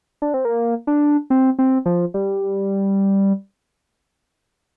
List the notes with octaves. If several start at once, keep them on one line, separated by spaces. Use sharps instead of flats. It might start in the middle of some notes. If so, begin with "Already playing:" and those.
D4
C4
A#3
D4
C4
C4
F3
G3